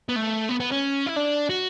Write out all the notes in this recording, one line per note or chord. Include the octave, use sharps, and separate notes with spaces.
B3
A3
B3
B3
C#4
E4
D4
F#4